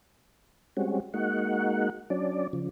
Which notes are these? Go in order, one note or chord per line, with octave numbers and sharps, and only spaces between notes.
G3 G#3 C4 C#4 F#4
G#3 A#3 D#4 F#4 F#5
F#3 C#4 D4 D5
C#3 F3